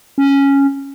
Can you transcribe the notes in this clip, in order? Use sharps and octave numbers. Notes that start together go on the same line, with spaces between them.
C#4